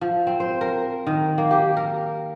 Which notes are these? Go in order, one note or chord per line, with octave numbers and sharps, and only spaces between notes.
F3
C4
C5
A#4
D#3
A#3
G4
A#4